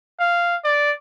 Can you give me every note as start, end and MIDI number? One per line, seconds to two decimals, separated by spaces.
0.20 0.56 77
0.64 0.92 74